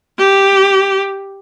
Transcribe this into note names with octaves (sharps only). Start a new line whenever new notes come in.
G4